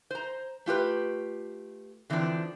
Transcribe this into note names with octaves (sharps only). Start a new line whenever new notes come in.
C5 A#5
A3 F4 G4 B4
D3 E3 F3 C4 D4